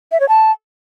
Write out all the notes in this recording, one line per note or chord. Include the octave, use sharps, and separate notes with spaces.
E5
C#5
A5